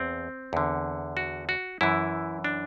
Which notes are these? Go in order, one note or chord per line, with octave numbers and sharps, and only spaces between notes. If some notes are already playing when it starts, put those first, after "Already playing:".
Already playing: E2 C4
E2 D3
F#4
F#4
F#2 E3 E4
D4